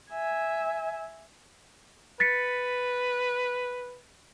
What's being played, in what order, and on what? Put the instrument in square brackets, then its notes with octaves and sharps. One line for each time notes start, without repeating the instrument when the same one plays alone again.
[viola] E5 G#5
[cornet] B4 [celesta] A6 B6 C#7